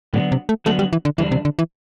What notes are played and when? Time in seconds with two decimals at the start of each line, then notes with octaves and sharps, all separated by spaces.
0.14 A2 D3 F#3 B3 D4 F#4
0.32 C3
0.49 A3
0.66 D3 F#3 A3 B3 D4 F#4
0.79 G3
0.93 E3
1.05 D3
1.18 E2 D3 E3 G3 D4
1.32 C3
1.45 D3
1.59 E3